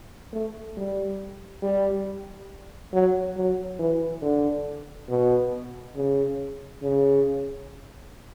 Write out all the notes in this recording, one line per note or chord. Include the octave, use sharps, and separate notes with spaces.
A3
G3
G3
F#3
F#3
E3
D3
B2
C#3
C#3